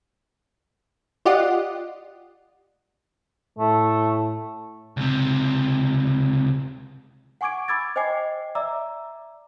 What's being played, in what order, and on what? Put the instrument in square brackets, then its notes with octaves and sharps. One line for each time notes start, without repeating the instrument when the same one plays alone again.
[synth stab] F4 G4 D5 D#5 F#5
[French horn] A2 [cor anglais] A3
[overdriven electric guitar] C#2 C3
[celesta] F#5 G#5 C#6 D6 G#6 D7
B5 D6 E6 G#6 A6
C5 D#5 G5 G#5 D6 C7
D5 E5 A#5 D6 E6